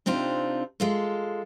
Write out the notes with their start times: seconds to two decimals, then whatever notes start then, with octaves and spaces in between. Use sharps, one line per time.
0.06 C3 C4 D4 D#4 F4
0.80 G#3 F4 A4